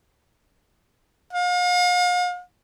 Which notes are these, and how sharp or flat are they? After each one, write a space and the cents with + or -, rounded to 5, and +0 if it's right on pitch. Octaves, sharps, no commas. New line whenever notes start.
F5 +40